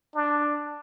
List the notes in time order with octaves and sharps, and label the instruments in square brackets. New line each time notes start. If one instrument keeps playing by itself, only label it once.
[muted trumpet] D4